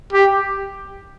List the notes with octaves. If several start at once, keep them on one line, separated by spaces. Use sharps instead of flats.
G4